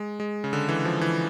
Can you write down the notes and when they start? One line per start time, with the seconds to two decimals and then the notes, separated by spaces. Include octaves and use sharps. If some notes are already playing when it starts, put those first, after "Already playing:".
Already playing: G#3
0.20 G#3
0.44 C#3
0.53 D3
0.69 E3
0.85 F3
1.01 E3